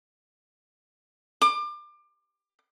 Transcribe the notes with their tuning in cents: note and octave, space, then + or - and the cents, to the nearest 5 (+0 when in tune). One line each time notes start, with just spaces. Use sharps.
D6 +30